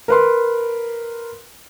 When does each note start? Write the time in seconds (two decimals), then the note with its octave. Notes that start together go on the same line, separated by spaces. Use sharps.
0.08 A#4 B4 C6